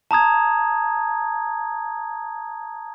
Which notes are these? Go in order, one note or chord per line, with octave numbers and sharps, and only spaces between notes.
A5 A#5 D#6 G#6